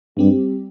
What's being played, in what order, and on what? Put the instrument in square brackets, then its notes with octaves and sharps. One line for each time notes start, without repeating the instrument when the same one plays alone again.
[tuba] G2 [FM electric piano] G3 C4 G4